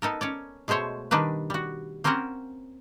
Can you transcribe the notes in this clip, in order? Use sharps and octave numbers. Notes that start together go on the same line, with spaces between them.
B3 D#4 A4 A#4
C#4 C#5 D5
B2 G#3 A3 C5 C#5
D#3 G3 D4 D#4 B4
G3 F#4
A#3 C4 C#4 A#4 C5 F#5